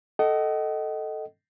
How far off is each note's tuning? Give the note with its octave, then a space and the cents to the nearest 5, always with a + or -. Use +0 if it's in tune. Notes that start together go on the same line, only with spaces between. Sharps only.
A4 +0 D#5 +0 F#5 +40